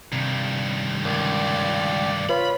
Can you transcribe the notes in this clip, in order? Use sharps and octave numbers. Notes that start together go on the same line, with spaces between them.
G2 C3 D#3
C#2 A#4 D5
F4 B4 C#5 B5